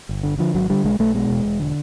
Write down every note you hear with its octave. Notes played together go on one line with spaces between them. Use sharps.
G1
D3
D3 F3
G#1 F#3
D3 G3
B1 G#3
B1 A3
B2 G#3
E1
E1
D3